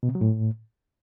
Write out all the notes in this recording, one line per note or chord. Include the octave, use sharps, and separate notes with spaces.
B2
C3
F#3
A2